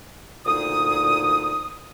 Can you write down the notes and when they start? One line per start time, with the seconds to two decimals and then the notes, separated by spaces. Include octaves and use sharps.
0.46 D2 A#2 D#4 D#6